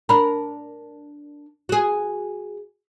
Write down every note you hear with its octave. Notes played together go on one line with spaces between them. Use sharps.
D4 A#4 A#5 B5
F#4 G#4